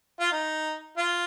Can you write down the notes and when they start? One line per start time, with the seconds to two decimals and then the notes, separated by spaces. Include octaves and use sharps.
0.20 F4
0.32 D#4
0.97 F4